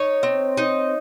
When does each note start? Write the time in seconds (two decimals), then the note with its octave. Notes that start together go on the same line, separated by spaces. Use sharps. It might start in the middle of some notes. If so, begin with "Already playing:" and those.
Already playing: D#4 C#5
0.23 C4
0.57 D#4